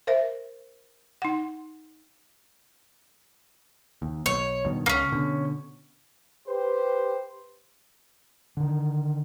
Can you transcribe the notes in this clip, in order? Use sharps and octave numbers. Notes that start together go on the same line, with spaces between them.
A#4 C5 E5
D#4 F#5
D#2
B1 C#5
G2 B2 D#3
C#2 A#3 C#4
B2 D3
G4 B4 C5
D3 D#3